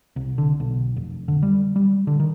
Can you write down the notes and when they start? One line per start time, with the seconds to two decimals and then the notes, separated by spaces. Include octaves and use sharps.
0.16 C2
0.38 D3
0.60 B1
0.96 F1
1.28 D3
1.43 G3
1.76 G3
2.07 D3
2.20 D#3